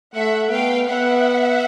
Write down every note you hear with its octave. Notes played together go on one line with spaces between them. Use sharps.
A3 E5 F#5
B3 F5 G5
B3 E5 F#5